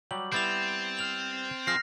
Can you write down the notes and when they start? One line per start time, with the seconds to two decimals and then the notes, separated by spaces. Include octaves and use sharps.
0.11 F#3 G3 G4 F#7
0.32 G3 B3 C4 E4 G6 A6 F7
0.97 F6 F7 F#7
1.67 F3 G#4 F6 A#6 C7